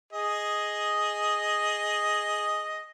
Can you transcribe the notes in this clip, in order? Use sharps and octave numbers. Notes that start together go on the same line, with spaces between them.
G#4 D#5